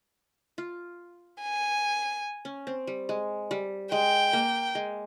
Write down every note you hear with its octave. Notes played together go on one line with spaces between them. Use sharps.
F4
G#5
C#4
C4
G3
G#3
G3
G#3 G5
A#3
G#3